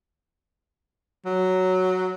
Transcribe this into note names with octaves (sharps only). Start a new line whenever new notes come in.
F#3